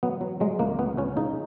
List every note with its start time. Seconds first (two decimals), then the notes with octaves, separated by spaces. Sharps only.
0.03 F#3 B3
0.21 F#3
0.40 F#3 G#3
0.59 C#2 A#3
0.79 C#2 B3
0.97 C#2 C#4
1.17 C#3 D#4